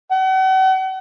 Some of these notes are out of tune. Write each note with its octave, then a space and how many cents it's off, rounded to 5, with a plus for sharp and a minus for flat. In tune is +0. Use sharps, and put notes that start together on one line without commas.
F#5 +40